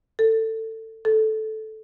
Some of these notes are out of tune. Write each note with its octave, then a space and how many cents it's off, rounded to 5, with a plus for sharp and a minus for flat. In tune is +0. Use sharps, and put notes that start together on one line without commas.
A4 +20
A4 -10